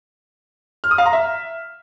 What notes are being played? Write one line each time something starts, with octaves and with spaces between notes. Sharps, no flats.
F6
D#6
F5
A#5
E5